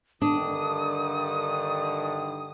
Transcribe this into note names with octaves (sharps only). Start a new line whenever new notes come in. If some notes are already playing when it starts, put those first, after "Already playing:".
G2 D3 D#3 D4 D#6